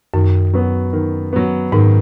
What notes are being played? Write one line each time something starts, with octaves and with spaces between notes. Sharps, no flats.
F#2 D#3
F#3 B3
D#3
F#3 B3
G#2 D#3